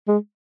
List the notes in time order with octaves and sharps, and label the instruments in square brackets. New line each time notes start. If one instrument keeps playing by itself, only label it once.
[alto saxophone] G#3